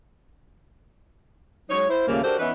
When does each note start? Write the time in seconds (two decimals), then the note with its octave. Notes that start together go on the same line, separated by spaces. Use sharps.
1.70 F#3 G#3 D#4 C#5
1.88 E4 C5
2.08 D#2 A#2 C#3 G3 A3 A#3
2.24 D4 F#4 G4 A4 A#4 C5
2.39 E3 B3 C#4 D#4 E4 B4